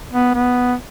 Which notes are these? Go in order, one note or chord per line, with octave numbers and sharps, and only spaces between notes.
B3
B3